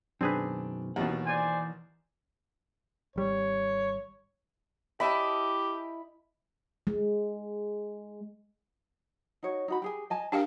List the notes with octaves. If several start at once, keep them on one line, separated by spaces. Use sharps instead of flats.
F#2 B2 D#3 C4 D4 G#4 B4
D#2 B2 E3 F#5
C5 D5 G#5
G#1 G3 C#5
E4 G4 D#5 A5 B5
G#3
D#4 F#4 C#5
D#4 F#4 B5
G4 G#4 G#5
D#5 G#5 A5
D4 G4 A#4 F5 G5 A5